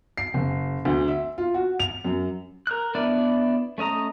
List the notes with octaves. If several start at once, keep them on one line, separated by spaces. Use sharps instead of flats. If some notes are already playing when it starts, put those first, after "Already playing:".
C7
F#1
D2
E5
F4
F#4
F7
F#2
A#4 F#6
B3 D4 E4 B4 D5
A3 C#4 D#5 A#5